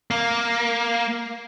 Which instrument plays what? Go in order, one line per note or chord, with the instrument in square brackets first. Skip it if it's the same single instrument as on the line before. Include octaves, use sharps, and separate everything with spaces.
[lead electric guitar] A#3